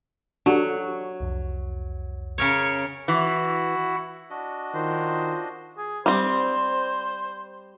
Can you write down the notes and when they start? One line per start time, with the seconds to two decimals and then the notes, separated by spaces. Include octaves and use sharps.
0.46 F#3 D4 F#4 G4 A4 D5 C#6
1.20 C2 F2
2.38 C#3 A#4 C#5
3.08 E3 E4 F#4 F#5
4.30 D4 F#4 D#5
4.74 D#3 F4 C5
5.78 G#4
6.06 G3 C4 C5